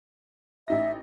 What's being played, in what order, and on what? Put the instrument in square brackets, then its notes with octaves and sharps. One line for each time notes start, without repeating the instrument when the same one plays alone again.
[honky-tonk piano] A1 D#4 A#6 [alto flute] E5